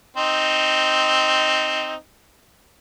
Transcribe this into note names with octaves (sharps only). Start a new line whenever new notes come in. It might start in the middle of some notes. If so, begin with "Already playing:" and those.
C4 D#4